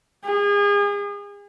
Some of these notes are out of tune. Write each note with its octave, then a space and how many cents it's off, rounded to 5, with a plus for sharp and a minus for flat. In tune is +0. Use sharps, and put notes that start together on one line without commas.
G#4 -35